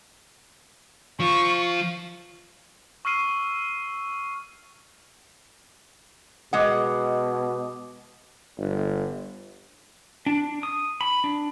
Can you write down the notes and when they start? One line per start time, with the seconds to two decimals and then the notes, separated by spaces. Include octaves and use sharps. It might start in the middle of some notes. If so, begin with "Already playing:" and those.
1.20 F3 F4 C#6
3.05 C#6 E6 F6 C7 D#7
6.53 B2 G#3 D#5 F#5 D6 D#6
8.58 G1
10.26 D4
10.63 D#6
11.01 B5
11.24 D4